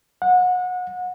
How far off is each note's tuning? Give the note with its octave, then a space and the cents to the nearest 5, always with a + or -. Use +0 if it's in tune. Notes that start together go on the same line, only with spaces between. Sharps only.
F#5 -25